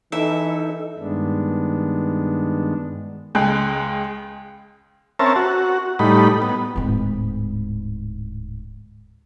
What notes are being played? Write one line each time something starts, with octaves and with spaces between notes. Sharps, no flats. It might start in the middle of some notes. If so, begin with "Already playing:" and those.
E3 D#4 A4 E5
G2 D#3 G#3 B3 D4
C#2 G#3 G5 F#6
C4 C#4 A#4 E5 A5
F#4
A2 G3 D#4 B5
B3
D1 G#2